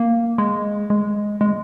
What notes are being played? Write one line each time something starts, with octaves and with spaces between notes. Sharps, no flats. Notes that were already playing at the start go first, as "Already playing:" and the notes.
Already playing: A#3
G#3
G#3
G#3